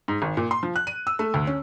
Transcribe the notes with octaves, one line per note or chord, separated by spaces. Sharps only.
G#2
G#1
A#2
C6
F3
F#6
D#7
E6
A3
D2
C#4